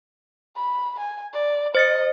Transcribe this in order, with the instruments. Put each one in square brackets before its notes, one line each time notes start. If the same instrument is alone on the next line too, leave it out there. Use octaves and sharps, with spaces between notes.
[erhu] B5
G#5
D5
[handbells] C5 A6 C#7 [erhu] D#5